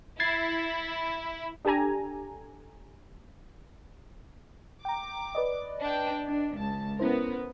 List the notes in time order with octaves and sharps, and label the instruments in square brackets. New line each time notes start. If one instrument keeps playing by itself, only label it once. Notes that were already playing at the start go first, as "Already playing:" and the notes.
[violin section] E4 [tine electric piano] G#6 A6 C7
[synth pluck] D4 G4 A4 G#5 A#5
[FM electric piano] G5 A#5 [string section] D6
[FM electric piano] B4 D5 D#5
[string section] D4 G5
D4
C#2 A5
[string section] B3 A#4 [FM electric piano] C#4 E4 C5